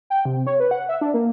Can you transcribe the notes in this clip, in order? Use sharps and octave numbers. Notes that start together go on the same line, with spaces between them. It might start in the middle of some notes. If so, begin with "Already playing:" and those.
G5
C3
C#5
B4
F#5
E5
D4
A#3